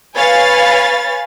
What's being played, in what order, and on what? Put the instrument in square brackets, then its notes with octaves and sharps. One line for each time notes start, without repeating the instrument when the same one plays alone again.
[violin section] B4 C#5 F5 G#5 B5 A6